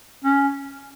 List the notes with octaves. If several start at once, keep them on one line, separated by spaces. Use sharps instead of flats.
C#4